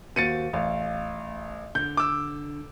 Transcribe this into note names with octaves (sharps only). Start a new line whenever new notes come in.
D#2 F#4 C5 A6 C#7 D#7
A1 F5
D3 G6
D6 E6